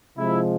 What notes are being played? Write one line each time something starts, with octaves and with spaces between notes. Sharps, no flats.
C3 F3 G#3 E4